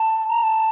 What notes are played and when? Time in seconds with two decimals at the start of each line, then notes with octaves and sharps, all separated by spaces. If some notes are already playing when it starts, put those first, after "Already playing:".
Already playing: A5
0.29 A#5
0.43 A5